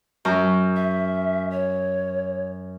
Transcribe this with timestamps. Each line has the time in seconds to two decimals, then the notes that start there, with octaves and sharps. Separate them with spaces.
0.25 F#2 A#5
0.76 E5
1.50 C#5